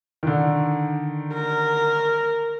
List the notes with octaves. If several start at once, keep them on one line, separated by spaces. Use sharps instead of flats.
D3 D#3
A#4